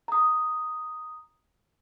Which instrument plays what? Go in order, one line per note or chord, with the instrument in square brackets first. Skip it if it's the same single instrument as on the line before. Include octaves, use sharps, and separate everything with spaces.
[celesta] A#5 D#6